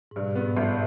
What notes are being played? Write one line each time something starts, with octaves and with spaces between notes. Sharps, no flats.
G#2
G2 B2
B2
G#2 B3
G1 B2